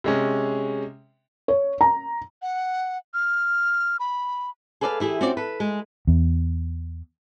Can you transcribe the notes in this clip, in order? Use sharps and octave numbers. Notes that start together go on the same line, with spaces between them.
C3 G#3 C#4
C#5
A#5
F#5
F6
B5
G#4 A4 B4 D5 D#5 F5
E3 E4 G4 G#4
C4 C#4 F4 F#4 D5
A4 B4
G#3
E2